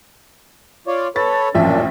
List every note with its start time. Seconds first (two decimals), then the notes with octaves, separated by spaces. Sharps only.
0.87 F4 C#5 D5
1.16 A4 B4 C#5 A6
1.55 A1 F#2 A#2 F3 D4 E5